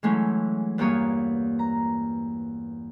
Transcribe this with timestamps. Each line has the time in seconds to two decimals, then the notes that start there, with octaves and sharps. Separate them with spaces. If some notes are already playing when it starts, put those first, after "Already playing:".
0.03 E3 F#3 G#3 A3 C#4 E4
0.78 E2 G2 A#3 F4 C#5 D#6
1.59 A#5